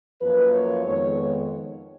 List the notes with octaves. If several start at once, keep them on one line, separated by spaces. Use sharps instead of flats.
F#2 F3 A#3 B4
C#5
F2 D#3 G#3 B3 C#5